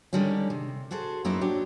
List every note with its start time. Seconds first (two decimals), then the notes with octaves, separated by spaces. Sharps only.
0.13 D3 D#3 G3 G#3 C#4
0.50 C3
0.91 F#4 G#4 A4 C5
1.25 F#2 A#3 B3 D#4 E4 C5
1.41 F#3 D4 G4